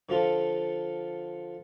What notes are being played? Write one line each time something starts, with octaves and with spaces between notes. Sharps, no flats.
D3 F3 F4 A4